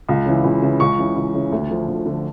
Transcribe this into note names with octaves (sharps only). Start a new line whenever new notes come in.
C#2
C#3 E3
C#2
C#3 E3
C#2 C#6
C#3 E3
C#2
C#3 E3
D2
D3 F3
D2
D3 F3